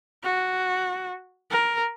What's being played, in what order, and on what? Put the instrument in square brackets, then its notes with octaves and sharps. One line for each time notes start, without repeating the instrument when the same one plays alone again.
[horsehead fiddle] F#4
A#4